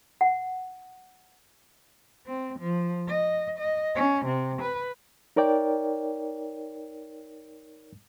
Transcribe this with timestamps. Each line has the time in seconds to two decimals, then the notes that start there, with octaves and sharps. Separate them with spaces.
0.21 F#5
2.26 C4
2.59 F3
3.08 D#5
3.59 D#5
3.95 C#4
4.26 C3
4.62 B4
5.36 D#4 A#4 C#5 D5 G5